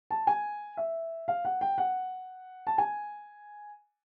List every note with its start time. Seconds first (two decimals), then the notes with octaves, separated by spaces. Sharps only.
0.11 A5
0.27 G#5
0.77 E5
1.28 F5
1.45 F#5
1.61 G5
1.78 F#5
2.67 A5
2.78 G#5